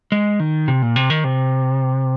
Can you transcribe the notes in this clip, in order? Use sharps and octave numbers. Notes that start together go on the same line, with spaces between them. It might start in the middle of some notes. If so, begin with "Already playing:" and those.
G#3
D#3
C3
A#2
C3
D#3
C3